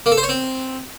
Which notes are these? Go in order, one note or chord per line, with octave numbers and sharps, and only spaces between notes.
A#3
A4
C5
C#5
C4